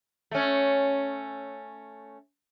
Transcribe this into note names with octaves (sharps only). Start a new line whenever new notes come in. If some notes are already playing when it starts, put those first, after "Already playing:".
A3 C#4